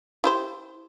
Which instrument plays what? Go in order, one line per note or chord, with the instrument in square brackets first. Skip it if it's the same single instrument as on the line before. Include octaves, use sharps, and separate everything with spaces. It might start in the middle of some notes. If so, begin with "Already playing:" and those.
[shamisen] E4 G4 C5